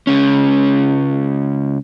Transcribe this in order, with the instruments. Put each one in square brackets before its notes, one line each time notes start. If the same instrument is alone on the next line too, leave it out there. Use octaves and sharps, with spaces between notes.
[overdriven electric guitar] C#2 C#4